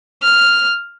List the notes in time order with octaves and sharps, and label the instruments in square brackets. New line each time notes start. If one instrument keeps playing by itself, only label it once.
[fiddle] F6